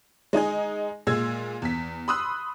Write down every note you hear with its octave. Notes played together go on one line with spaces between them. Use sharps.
G#3 D#4 D#5 G#5
A#2 G#3 E6 G#6
E2 B6
B5 C6 D#6 E6 F#6